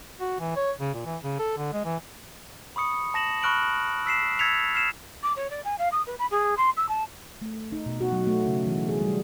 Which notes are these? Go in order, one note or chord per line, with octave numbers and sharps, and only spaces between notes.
F#4
E3
C#5
C#3
A#2
E3
C#3
A4
D3
G#3
E3
B5 C#6 D#6 C#7
A5 A#6 E7 F#7
B5 C#6 F6 F#6 D7 F#7
E6 B6 C7 E7
E6 G#6 A6 B6 C#7 F7
F6 C7 E7 F7
D6
C#5
D5
G#5
F5
D#6
B4
B5
G#4
C6
E6
A5
A3
D#4
B2
F#4
F#3
A3
C#3
E3
G#4
G3